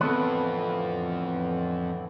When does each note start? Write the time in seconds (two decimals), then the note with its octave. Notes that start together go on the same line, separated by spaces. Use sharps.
0.01 F2 A2 D3 E3 B3 A4 B4